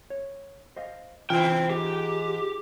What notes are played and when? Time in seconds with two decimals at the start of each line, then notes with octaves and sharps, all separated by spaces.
0.10 C#5
0.76 C5 D#5 F5
1.30 C3 E3 E4 F4 C5 G5
1.70 G#2 G4